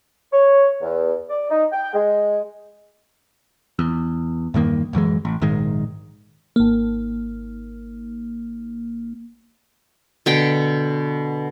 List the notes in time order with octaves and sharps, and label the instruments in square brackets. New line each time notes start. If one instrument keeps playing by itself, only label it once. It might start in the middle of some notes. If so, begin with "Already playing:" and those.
[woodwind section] C#5
E2
D5
D#4
G5
G#3
[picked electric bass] E2
E2 G2 D#3 A#3
D1 F#2 E3 G#3
A1
A#1 G#2 D#3 G#3
[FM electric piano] G#1 A#3
[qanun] B2 D3 G5